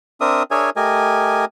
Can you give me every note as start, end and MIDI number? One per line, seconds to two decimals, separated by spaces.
0.21 0.43 60
0.21 0.43 62
0.21 0.43 70
0.21 0.43 76
0.21 0.43 87
0.51 0.70 62
0.51 0.70 68
0.51 0.70 70
0.51 0.70 73
0.51 0.70 76
0.51 0.70 80
0.76 1.45 57
0.76 1.45 67
0.76 1.45 70
0.76 1.45 75
0.76 1.45 80